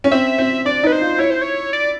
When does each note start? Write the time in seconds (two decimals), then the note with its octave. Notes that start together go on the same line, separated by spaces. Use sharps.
0.04 C#4
0.11 C4 E5
0.38 C4
0.65 D4 D5
0.83 D#4 B4
0.92 C5
1.01 F4
1.18 E4 C#5
1.30 C5
1.42 C#5
1.73 D5